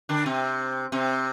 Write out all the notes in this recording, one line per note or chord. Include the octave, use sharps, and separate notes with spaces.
D3 D4
C3 C4
C3 C4